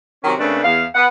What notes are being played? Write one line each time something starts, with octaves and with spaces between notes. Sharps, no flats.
C3 D#3 F#3 C#4
C#3 A3 A#3 C4 D4 B4
E2 F5
B3 F#5